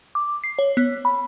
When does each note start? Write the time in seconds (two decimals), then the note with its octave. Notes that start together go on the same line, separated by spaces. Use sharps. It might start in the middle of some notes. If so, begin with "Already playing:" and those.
0.15 D6
0.44 C7
0.59 C#5
0.77 B3
1.05 B5